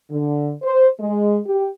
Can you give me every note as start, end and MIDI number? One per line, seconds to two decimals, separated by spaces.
0.10 0.52 50
0.62 0.87 72
0.99 1.38 56
1.46 1.69 67